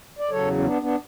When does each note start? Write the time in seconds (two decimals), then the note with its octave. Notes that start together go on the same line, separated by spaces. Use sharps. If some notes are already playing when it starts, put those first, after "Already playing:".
0.19 D5
0.31 E2 C#3 F#3 A4 C#5
0.58 C#4
0.65 B3 D4
0.82 B3 D4